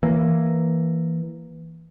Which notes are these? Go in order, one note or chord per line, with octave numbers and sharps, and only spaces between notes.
E3 A#3